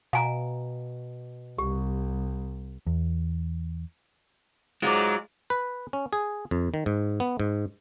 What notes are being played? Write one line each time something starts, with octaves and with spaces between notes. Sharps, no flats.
B2 F5 G#5 A#5
C2 G4
E2
G#2 F#3 G#3 F4 D5
B4
C#4
G#4
F2
D#3
G#2
B3
G#2